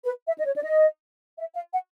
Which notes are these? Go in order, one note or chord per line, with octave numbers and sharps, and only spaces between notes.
B4
E5
D#5
C#5
D5
D#5
E5
F5
F#5